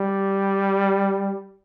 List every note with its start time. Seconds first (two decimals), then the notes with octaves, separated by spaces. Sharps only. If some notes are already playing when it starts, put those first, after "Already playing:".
Already playing: G3